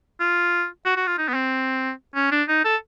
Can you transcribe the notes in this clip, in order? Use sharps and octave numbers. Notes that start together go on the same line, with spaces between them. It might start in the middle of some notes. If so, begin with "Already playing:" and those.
F4
F#4
F#4
F4
D#4
B3
C4
C#4
D4
D#4
A4